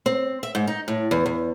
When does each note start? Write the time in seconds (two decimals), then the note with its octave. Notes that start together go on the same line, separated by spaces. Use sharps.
0.06 C4
0.43 E5
0.55 G#2
0.67 D#4
0.88 A2
1.11 E2
1.26 E2